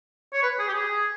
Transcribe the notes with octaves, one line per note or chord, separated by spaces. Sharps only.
C#5
B4
G#4
G4
G#4